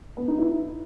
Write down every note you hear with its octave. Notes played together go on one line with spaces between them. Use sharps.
B3
D#4
E4